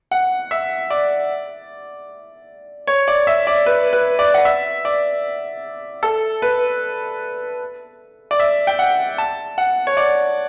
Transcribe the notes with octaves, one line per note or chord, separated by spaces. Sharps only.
F#5
E5
D5
C#5
D5
E5
D5
B4
B4
D5
F#5
E5
D5
A4
B4
D5
E5
G5
F#5
A5
F#5
C#5
D5